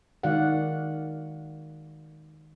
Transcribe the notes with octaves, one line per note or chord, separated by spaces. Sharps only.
D#3 G#3 F#4 D5 F5 F#5